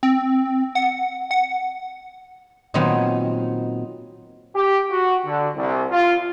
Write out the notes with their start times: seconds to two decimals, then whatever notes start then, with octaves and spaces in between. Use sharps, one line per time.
0.03 C4
0.75 F#5
1.31 F#5
2.74 A#2 D#3 F#3 B3 C4 D#4
4.55 G4
4.90 F#4
5.26 D3
5.56 C2
5.91 F4